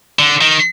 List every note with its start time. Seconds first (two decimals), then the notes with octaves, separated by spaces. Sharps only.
0.19 D3
0.41 D#3